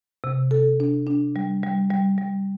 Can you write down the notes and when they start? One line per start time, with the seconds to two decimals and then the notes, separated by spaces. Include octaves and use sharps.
0.24 C3
0.51 A4
0.80 D4
1.07 D4
1.36 G3
1.63 G3
1.90 G3
2.18 G3